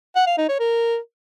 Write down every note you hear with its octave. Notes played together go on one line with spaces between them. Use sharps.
F#5
F5
D#4
C#5
A#4